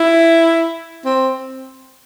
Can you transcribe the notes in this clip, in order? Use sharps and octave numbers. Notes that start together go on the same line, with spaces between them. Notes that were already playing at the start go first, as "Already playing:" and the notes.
Already playing: E4
C4